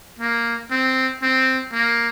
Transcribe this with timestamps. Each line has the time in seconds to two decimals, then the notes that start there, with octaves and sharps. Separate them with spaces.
0.19 A#3
0.71 C4
1.22 C4
1.72 A#3